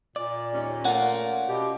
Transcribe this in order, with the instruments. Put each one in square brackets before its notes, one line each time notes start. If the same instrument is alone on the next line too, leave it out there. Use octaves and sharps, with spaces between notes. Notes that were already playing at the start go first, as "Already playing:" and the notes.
[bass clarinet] A#2 [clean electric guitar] D5
[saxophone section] D#2 G#3 C#4
[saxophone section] A3 A#3 A#4 [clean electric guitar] C#4 F4 [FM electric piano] F#5
[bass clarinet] B2 [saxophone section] G4